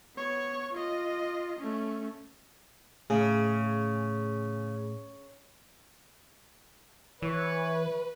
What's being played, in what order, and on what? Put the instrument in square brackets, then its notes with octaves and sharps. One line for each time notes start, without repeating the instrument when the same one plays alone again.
[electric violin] B3 C#5
F4 D#5
A3 C#4
[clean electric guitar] A2 [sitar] C#3 [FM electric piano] G#4
[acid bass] E3 [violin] B4 [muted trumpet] C#5